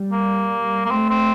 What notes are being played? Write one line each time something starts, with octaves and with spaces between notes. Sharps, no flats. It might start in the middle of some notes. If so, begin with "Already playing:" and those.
Already playing: G3
A#3
A#3
A3 C4
C4